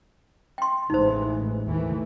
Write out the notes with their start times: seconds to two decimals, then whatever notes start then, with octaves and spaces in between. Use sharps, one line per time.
0.58 G5 C6
0.90 A1 E3 G#3 D#4 C5
1.68 D#2 E3 A3